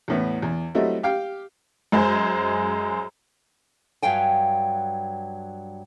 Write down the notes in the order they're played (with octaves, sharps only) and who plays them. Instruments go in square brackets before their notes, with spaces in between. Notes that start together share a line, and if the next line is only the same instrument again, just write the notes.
[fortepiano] E2 A2 B3
E2
F#3 G3 A3 C4 E4 D#5
G4 F5 G5
[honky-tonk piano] F#2 G#3 G#4 C5
[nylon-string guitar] G2 F#3 F5 G5 G#5